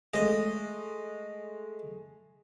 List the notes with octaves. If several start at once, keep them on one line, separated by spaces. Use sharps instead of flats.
G#3 A3 D#5